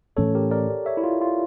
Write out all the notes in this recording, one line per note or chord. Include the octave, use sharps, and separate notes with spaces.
A2 E3 A3 C#4 A4 C#5
G4 A#4
A#4 D5
C#5 E5
E4
F4
F4